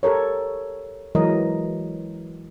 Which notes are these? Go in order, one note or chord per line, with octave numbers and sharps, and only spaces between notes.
G4 A4 A#4 C#5
E3 F#3 G#3 A#4 D#5